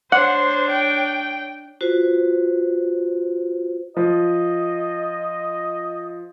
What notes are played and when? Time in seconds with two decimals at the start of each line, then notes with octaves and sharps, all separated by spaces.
0.12 D4 C5 C#5 F#5
0.70 G5
1.81 F4 F#4 B4 C5
3.97 F3 D#5